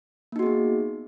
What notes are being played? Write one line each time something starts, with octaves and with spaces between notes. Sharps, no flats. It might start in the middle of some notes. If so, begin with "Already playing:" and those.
A#3 B3 D#4 F#4 G#4